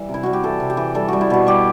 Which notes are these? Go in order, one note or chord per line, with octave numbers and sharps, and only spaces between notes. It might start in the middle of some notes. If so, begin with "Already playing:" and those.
Already playing: E3 G3
C3
E4
G3 F#4
G4
E3 A4
C3
G4
E3
G3 A4
G3 F#4
E4
B2 F#4
G3 G4